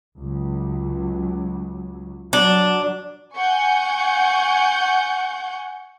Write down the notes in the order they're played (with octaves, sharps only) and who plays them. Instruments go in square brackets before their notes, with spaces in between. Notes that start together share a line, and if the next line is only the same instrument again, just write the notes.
[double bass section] C#2 F#3
[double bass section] F#3 [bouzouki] D4
[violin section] F#5 G#5 C#6 G6